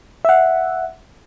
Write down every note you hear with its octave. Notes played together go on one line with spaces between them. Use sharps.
E5 F#5